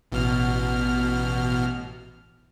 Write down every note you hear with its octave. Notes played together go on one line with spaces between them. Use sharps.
A1 B2 F6